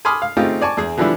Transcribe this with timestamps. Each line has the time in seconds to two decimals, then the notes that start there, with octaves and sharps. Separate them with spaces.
0.05 G#5 B5 C6 D6 D#6 F6
0.22 F5
0.37 C#3 A3 C4 D#4 F4 G4
0.62 D5 G#5 A5 C#6
0.77 E2 G#4
0.98 D3 E3 F3 G3 B3 E4